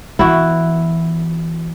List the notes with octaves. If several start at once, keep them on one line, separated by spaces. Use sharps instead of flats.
E3 B3 E4 F#4